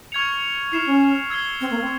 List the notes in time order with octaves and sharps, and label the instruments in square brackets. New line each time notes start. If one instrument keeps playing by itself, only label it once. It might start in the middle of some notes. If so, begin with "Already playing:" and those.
[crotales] C#6 F6 G#6 C#7 F7
[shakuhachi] E4 [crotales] F6 C7 E7
[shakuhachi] C#4
[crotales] E6 G#6 C7 G7
[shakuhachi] C4
A#3
C4